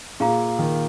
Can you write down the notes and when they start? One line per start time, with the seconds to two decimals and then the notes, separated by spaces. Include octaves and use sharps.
0.20 A#2 G#4 F5 A#5
0.59 D#3